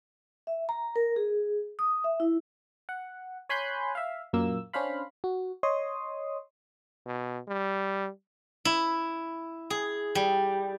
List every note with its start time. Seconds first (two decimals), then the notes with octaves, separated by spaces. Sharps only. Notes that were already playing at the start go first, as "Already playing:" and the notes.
0.47 E5
0.69 A#5
0.96 A#4
1.16 G#4
1.79 D#6
2.04 E5
2.20 E4
2.89 F#5
3.49 C#5 G#5 B5 C6 F#6 G6
3.95 E5 F5
4.33 F#2 A#2 A#3 E6
4.73 C#4 D4 C5 F5 B5
5.24 F#4
5.63 C#5 D#5 C6 D#6
7.06 B2
7.48 G3
8.65 E4
9.70 G#4
10.15 G3